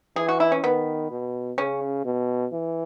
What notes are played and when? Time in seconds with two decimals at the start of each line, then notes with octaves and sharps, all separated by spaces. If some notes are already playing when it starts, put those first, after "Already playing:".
0.16 E3 G#4
0.28 F#4
0.40 E4
0.52 C#4
0.64 D#3 B3
1.10 B2
1.58 C#3 C#4
2.05 B2
2.52 E3